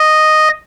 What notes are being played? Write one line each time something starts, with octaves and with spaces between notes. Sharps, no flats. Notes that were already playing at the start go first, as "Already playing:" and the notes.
Already playing: D#5